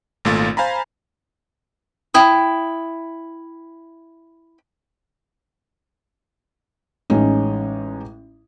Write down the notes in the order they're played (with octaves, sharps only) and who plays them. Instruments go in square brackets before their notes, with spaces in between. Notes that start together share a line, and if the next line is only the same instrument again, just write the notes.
[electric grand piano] G#1 A#2 A3 F4 A6
C5 F5 G#5 A#5 B5
[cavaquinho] E4 G5 D#6
[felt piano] A1 G#3 C#4 D#4